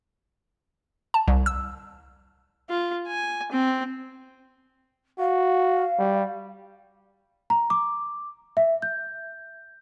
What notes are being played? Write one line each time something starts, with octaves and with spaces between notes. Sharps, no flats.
A5
C2
E6
F4
G#5
C4
F#4 F5
G3
A#5
D6
E5
G6